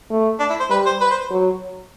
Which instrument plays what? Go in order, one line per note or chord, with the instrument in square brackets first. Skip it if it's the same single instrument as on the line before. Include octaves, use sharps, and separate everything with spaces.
[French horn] A3
[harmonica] D4
E4
C5
[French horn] G3 [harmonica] B4
[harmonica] C5
B4
C5
[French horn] F#3